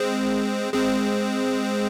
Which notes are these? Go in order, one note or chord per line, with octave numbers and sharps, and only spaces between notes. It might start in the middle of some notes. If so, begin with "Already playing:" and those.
Already playing: G#3 C4
G#3 C4